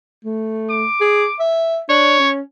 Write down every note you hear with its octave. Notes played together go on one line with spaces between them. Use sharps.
A3
D6
G#4
E5
D4 C#5
C#4